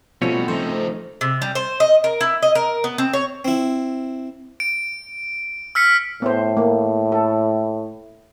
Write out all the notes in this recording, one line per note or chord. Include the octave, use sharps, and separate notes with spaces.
B2 F3 G3 A3 C4 C#4 C#5
F3 A3 D#4 C5
C3
G3
C5
D#5
A#4
E4
D#5
A#4
B3
C4
C#5
C4 E4
D7
E6 F6 B6 C#7
A2 B3 C5
A#3
A4